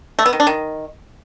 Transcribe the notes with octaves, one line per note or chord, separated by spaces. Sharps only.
A3
B3
D#3
D4
D#3